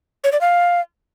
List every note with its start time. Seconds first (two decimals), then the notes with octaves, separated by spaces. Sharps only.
0.24 C#5
0.32 D5
0.41 F5